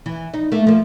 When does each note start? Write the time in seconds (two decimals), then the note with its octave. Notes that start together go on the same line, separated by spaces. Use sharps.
0.06 E3
0.34 D#4
0.52 A3 A#3
0.67 F3 A#3